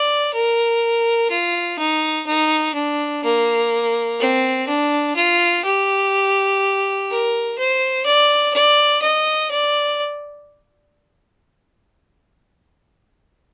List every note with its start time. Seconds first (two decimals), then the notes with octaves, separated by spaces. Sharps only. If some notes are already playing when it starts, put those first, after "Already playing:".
Already playing: D5
0.34 A#4
1.30 F4
1.78 D#4
2.26 D#4
2.74 D4
3.24 A#3
4.20 C4
4.68 D4
5.16 F4
5.64 G4
7.10 A#4
7.58 C5
8.06 D5
8.54 D5
9.02 D#5
9.51 D5